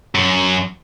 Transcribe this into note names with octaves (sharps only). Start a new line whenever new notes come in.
F#2